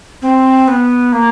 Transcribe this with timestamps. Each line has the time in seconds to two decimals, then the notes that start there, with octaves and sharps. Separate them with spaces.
0.22 C4
0.68 B3
1.12 A#3